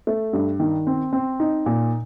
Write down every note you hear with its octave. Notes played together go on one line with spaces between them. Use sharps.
A3
G2
D#3
C4
C4
D#4
A#2